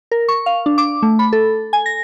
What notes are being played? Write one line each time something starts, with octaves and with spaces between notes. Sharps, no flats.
A#4
C#6
F5
D4
D6
A3
B5
A4
G#5
A#6